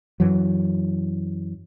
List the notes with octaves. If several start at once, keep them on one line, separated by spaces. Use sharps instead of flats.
F#2 E3 F#3